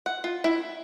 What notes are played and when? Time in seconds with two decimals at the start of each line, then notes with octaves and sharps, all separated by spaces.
0.06 F#5
0.24 F4
0.44 E4